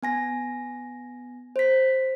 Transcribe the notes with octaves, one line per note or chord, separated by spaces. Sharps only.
B3 G#5 A#6
C5 B6